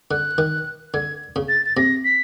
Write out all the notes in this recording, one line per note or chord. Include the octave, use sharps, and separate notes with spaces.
D3 F#6
D#3
D3 G#6
C#3
A6
A6
C3 A#6
B6